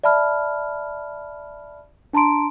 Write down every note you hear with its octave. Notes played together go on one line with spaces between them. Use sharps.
D5 E5 A5 B5 F6
D4 A5 A#5 C6 D7